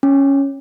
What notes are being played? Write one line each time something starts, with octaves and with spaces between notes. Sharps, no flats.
C#4